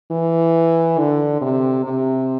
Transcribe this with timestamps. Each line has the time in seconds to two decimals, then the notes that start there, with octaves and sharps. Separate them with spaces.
0.11 E3
0.98 D3
1.41 C3
1.85 C3